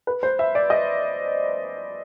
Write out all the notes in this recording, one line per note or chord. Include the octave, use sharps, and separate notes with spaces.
B4
C5
E5
D5
D#5